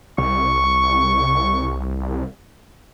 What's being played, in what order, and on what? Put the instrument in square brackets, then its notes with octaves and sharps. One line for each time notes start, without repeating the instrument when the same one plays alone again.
[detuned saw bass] C2 [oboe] C#6